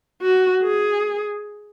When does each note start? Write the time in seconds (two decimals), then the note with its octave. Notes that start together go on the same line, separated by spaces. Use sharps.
0.22 F#4
0.62 G#4